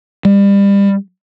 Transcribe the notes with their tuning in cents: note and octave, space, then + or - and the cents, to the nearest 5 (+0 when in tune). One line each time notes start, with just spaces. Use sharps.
G3 +30